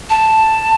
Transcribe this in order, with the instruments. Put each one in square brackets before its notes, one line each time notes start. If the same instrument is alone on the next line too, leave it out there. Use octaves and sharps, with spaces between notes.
[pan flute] A5